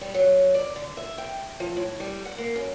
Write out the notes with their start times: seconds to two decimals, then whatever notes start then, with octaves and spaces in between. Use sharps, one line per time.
0.01 G3
0.14 F#3
0.55 D5
0.76 D3
0.97 E5
1.18 G5
1.60 F3
1.77 A2
2.00 G3
2.25 F#5
2.38 A#3
2.56 F#2